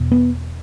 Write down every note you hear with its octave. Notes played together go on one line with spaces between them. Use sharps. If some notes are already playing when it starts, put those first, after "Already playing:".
Already playing: E2 B2
B3